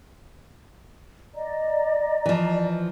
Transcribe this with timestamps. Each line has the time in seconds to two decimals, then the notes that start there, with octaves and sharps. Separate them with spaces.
1.34 D5 D#5 A#5
2.26 E3 F3